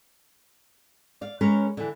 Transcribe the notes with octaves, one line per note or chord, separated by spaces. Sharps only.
D5 F5
G#3 C#4 A#4 B4 C#5
D3 E3